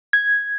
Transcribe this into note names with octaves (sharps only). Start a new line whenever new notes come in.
G#6